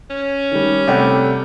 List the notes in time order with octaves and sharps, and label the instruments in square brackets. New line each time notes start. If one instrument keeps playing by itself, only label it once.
[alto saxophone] C#4
[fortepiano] D#3 G3
[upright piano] C3 G3 A3 [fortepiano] D5 F#5 G5